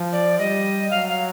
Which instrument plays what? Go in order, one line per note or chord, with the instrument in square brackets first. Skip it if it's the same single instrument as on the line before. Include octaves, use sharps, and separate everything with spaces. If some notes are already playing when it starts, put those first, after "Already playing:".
Already playing: [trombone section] F3
[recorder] D5
[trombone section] G3 [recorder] D#5
[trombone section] F#3 [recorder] F5
[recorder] F5